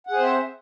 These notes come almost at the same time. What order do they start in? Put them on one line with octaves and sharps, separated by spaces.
F#5 G#4 C5 C4 E5